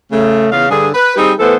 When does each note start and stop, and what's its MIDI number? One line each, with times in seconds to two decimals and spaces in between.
0.11 0.47 49
0.11 0.47 57
0.51 0.67 40
0.51 0.67 49
0.51 0.67 77
0.69 0.88 43
0.69 0.88 50
0.69 0.88 68
0.94 1.12 71
1.16 1.32 55
1.16 1.32 60
1.16 1.32 63
1.16 1.32 67
1.16 1.32 68
1.39 1.55 52
1.39 1.55 57
1.39 1.55 59
1.39 1.55 69
1.39 1.55 72